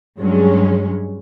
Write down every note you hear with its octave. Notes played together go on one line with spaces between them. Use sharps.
G2 F#3 G#3 C#4